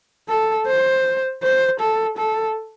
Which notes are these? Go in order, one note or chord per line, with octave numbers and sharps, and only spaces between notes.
A4
C5
C5
A4
A4